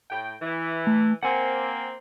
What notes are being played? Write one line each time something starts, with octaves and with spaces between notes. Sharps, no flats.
A2 G5
E3
A3
A#3 C4 F#5 G#5